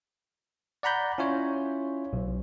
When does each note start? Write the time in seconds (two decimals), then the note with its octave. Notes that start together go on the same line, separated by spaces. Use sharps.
0.83 D5 F#5 A#5 B5 G6
1.18 C#4 E4 F4 C#5
2.13 B1